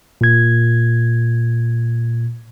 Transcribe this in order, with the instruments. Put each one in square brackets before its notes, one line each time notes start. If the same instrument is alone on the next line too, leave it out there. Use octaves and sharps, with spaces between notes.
[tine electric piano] A#2 G#6